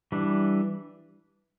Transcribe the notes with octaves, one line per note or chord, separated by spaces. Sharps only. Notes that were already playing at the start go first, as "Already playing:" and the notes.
E3 G3 D4